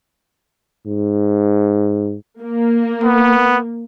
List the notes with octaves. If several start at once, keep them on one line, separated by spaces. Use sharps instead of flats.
G#2
A#3
B3